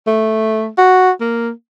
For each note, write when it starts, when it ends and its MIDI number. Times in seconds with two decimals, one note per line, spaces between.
0.07 0.68 57
0.78 1.11 66
1.21 1.50 58